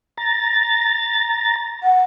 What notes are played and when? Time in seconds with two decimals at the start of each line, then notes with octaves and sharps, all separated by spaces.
0.17 A#5 A6
1.83 F#5